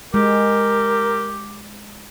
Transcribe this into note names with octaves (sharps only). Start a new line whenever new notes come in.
G#3 G4 A#4